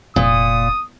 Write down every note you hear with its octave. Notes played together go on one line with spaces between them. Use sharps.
F1 A#2 D#6